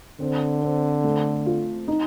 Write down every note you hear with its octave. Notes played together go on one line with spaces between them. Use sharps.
D3 C4
C4
A3
F4
D#4